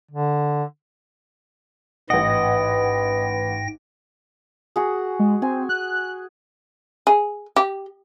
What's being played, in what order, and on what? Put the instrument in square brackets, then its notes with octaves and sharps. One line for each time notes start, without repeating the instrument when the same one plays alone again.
[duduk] D3
[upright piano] A1 F#5 [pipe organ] G#2 G5 A#6 [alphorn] B4 [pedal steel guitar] D#5
[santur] F#4 G#4
[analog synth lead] G#3
[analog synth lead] C4 [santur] G#5
[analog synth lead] F#6
[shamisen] G#4
G4